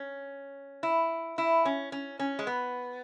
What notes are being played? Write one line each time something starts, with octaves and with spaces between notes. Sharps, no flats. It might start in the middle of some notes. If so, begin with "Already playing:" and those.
Already playing: C#4
E4
E4
C#4
C#4
C#4
G#3
B3